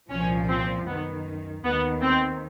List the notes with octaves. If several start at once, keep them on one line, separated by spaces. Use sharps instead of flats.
C2 A#2 F3 C#4
C4
F#2 D#3 B3
D#2 D#3 B3
C4